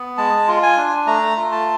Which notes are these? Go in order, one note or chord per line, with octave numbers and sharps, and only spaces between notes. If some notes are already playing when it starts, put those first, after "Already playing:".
Already playing: B3
G#3 A5
F4
G#5
D4
A3 A#5
F4
A5